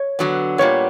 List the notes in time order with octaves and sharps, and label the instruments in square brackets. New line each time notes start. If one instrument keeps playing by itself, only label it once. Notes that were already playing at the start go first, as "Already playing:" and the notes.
Already playing: [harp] C#5
[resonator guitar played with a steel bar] D3 F#3 B3
[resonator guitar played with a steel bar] A#2 G3 B3 [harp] C#5